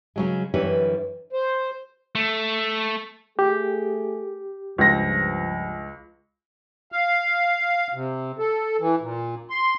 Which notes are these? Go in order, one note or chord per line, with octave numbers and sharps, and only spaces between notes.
C#3 F#3 G#3
F#2 D3 E3 G3 B4 C#5
C5
A3
A3 G4 G#4
C#2 G2 F3 A#6
F5
C3
A4
E3
A#2
C6